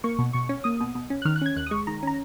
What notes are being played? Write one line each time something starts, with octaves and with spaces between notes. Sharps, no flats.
A#3 C#6
B2
B2 C#6
C#4
A#3 D#6
B2
B2
C#4
F#6
D#3 F6
F#6
C#4 G#6
D#2 F#6
D#6
G#3 C#6
D#3 A#5
C#4 A#5